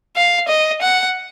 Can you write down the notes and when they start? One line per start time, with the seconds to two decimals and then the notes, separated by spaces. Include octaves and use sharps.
0.16 F5
0.48 D#5
0.82 F#5